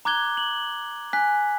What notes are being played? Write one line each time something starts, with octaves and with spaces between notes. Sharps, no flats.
A#5 D6 F#6 G#6 G7
F#7
G#5 F#6 B6